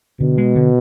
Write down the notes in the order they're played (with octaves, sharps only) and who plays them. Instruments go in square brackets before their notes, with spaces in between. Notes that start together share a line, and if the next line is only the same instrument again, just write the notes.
[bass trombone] B2 [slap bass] D3
[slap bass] G#3
D3